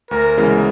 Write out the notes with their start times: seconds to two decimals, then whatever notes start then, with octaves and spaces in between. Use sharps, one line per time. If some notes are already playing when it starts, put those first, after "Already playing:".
0.11 D2 A#4
0.37 C#3 E3 G#3 B3